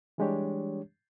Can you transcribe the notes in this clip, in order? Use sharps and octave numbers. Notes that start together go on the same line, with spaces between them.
E3 G3 G#3 D4 G4 C#5